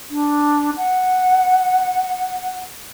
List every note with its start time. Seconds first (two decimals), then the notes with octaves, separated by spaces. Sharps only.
0.11 D4
0.77 F#5